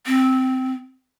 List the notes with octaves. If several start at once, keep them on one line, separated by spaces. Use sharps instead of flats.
C4